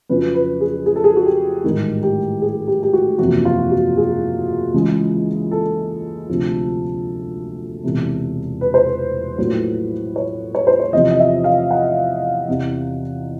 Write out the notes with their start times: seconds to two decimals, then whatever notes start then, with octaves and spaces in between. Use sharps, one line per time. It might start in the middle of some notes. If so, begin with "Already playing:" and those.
0.09 F2 C#3 F#3 B4
0.34 B4
0.61 G#4
0.86 G#4
0.96 A4
1.04 G#4
1.16 F#4
1.26 G4
1.64 A1 G#2 D#3 G3 G4
2.03 G4
2.42 G#4
2.68 G4
2.83 G4
2.93 F#4
3.18 F#1 E2 C3 F3 F#4
3.45 F4
3.71 F#4
3.97 G#4
4.74 C#2 C#3 E3 G#3
5.51 A4
6.29 D2 C3 F3
7.84 E1 E2 C3
8.61 B4
8.74 C5
8.87 B4
9.38 A#1 A2 F#3
10.16 C#5
10.55 C#5
10.67 C5
10.80 C#5
10.93 E2 C3 F3 D#5
11.11 D#5
11.20 E5
11.44 F5
11.71 F#5
12.48 E2 C3 E3